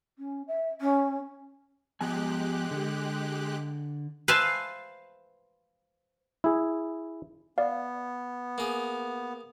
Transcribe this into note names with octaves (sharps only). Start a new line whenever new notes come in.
C#4
E5
C#4
F3 G#3 B3 G4 G#5 F#6
D3
B4 C5 E5 F5 G#5 A5
E4 G#4
B3 D5 F5
A#3 G#4